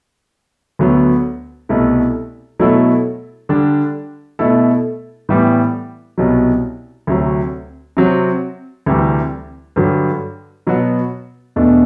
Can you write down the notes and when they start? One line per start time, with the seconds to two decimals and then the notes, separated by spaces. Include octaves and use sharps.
0.79 D2 D3 F#3 B3
1.69 C2 B2 A3 E4
2.59 B2 F#3 A3 E4 A4
3.49 D3 G3 D4
4.39 B2 A3 E4 A4
5.29 A2 E3 G3 B3
6.18 C2 B2 F#3
7.07 D2 C3 F#3
7.97 C3 F#3 C4
8.86 D2 C3 E3 G3
9.76 G2 D3 F#3
10.67 B2 F#3 B3 F#4
11.56 E2 B2 A3 D4